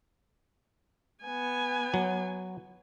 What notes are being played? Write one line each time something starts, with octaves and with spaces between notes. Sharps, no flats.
B3 G#5
F#3